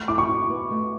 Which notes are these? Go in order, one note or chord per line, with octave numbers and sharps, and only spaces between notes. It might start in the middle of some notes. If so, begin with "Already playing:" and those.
Already playing: A3
E4 D6
C#6
E4
B3
A3